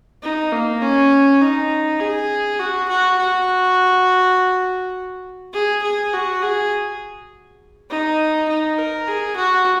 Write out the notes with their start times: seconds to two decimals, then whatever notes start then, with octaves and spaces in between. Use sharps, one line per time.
0.23 D#4
0.52 A#3
0.82 C#4
1.41 D#4
2.00 G#4
2.59 F#4
2.89 F#4
3.18 F#4
5.53 G#4
5.83 G#4
6.13 F#4
6.42 G#4
7.90 D#4
8.48 D#4
8.78 A#4
9.07 G#4
9.36 F#4